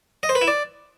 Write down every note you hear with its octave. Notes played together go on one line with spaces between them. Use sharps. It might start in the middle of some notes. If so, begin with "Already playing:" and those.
D#5
C5
B4
E4
D5